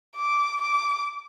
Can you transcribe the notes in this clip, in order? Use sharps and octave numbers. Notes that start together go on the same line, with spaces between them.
D6
D6